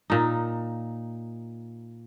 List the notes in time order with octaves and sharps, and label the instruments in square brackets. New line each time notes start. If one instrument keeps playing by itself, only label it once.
[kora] A#2 D#4